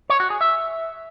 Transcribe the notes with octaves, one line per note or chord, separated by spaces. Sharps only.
C#5
F#4
G#4
E5